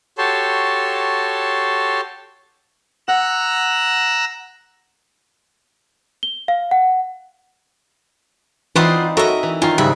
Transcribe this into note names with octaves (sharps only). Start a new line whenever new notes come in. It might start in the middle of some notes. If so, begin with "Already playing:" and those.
F#4 G4 A4 C#5 A5 C6
F#5 A#5 E6 F#6
G7
F5
F#5
E3 C4 D#4 F4 B4 D5 F#5 C6
F#4 A4 A#4 C#5 D#5 E5
E3
D#3 C#4 F4
G#2 C#3 G3 G#4 E5 F#6